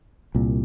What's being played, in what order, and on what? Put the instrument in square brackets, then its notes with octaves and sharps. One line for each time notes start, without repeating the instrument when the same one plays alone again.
[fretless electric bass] C2 A#2